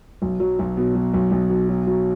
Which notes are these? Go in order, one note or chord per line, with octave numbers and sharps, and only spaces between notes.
B1
F#3
B1
B2
F#3
B1
B1
B2
F#3
F#3